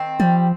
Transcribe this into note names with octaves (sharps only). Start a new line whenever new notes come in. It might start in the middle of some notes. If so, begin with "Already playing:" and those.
Already playing: D#3 C4
F3 G3